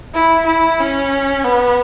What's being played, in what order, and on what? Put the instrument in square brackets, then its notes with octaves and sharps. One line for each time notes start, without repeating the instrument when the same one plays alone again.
[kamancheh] E4
E4
C#4
B3